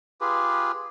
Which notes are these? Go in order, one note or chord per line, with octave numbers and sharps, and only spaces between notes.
F4 G4 G#4 B4